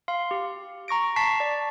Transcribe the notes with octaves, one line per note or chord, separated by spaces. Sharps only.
F5 C6
G4
A#5 C#6 A#6 D7
A5 C#6 B6 C7
D5